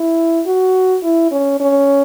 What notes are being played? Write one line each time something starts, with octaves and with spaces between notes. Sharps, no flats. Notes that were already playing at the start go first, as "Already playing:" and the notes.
Already playing: E4
F#4
E4
C#4
C#4